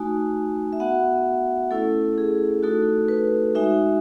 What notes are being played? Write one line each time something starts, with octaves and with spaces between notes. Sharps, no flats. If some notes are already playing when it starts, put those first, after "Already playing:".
Already playing: A3 D#4 F#4 G#5
E5
B3 F#4 F#5
A3 C#4 E4 A4
G#4
A3 D#4 F#4 A4
B4
G#3 D#4 F#4 E5